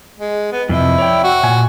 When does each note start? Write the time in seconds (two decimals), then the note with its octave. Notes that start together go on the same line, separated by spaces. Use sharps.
0.19 G#3
0.53 B3
0.69 F2 C3 E4 D#5
0.98 C#5 D5 G5
1.24 F#4
1.43 A#2 G#5